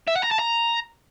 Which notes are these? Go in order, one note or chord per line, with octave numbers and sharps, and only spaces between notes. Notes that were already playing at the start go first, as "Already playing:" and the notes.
E5
F#5
A#5
A5
A#5